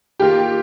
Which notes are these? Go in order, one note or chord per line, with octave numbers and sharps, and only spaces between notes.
D#3 A#3 F4 G4 A#4